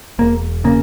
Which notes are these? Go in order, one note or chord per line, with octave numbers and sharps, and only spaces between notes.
E1 A#3
C#3 A#3